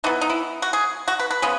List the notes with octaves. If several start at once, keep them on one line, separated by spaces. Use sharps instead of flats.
E3 B3 D#4
D#4
E4
F#4
G#4
F#4
B4
B4
C#3 G#3 B3